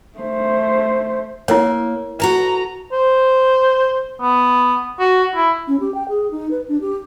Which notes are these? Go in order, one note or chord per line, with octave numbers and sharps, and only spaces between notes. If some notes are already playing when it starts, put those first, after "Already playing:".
A3 C5
A#3 E4 A#4 C#5
F#4 A4 B4 A#5
C5
B3
F#4
E4
C#4
G4
G5
G#4
D#4
B4
D4
G4